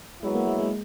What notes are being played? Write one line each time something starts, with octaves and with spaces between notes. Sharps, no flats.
F#3 G#3 B3 E4
A#3
G#3
G#3